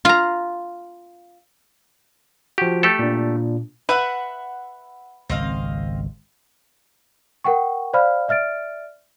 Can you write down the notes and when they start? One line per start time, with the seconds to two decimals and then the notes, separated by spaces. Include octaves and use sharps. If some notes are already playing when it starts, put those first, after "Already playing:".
0.05 F4 A#5
2.58 F3 F#4 G4
2.83 A3 G4 A4
2.99 A#2 D4
3.89 B4 E5 F#5
5.30 G#1 C#2 C4 D#5 F5
7.44 A#4 F#5 G5 C#6
7.93 C5 D5 F5 B5 F6
8.28 D5 E5 F6 A6 D7